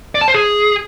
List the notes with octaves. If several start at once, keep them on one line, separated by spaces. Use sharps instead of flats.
D5
A5
C5
G#4